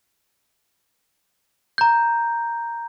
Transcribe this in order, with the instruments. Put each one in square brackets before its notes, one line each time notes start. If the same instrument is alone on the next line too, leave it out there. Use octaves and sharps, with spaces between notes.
[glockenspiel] A#5 G6